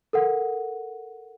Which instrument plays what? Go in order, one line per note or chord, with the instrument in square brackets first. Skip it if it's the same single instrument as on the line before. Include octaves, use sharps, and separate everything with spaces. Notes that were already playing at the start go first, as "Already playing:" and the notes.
[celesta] A4 A#4 F#5